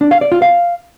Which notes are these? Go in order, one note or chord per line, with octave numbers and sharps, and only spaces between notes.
D4
F5
D5
F4
F5